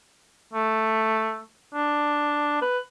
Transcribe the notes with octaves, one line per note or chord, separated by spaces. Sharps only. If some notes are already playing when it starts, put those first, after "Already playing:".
A3
D4
B4